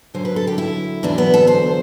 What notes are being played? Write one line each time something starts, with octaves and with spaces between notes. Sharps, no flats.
F#2 D3 F#3 C5
B4
A4
G4
E4
E2 D3 F#3 D4
B3
A4
C5